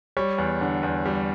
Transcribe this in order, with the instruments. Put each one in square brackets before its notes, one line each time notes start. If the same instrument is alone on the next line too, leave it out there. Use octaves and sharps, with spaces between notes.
[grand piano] G3 C#5
E2
D3
E2
G3